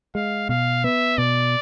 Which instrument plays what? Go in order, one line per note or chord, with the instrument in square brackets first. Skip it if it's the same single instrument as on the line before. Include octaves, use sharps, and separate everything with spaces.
[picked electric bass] G#3 [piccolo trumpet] F5
[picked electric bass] B2 [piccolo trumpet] F5
[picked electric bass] B3 [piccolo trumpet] E5
[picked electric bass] B2 [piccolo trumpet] D5